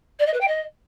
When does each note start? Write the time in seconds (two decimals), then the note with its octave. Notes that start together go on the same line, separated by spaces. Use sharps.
0.19 D5
0.26 D#5
0.33 B4
0.40 G5
0.47 D#5